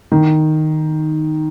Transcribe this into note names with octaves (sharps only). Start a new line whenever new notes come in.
D#3